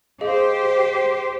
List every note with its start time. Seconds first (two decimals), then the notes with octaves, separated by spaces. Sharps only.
0.21 G4 G#4 C5 D#5 F5